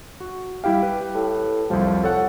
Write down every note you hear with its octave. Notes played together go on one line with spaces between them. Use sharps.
F#4
G3 E4 G4 F5
B4
A2
C2 F2 F3 G3
A4 C#5 F#5